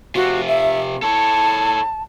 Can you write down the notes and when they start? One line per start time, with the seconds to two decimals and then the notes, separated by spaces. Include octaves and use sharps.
0.15 C3 F4 F#4
0.48 E5
1.02 A4 C#5 A5